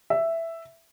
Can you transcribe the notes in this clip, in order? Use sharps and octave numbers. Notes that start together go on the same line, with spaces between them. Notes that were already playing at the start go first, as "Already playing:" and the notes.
E5